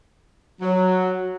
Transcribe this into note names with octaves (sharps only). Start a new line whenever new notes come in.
F#3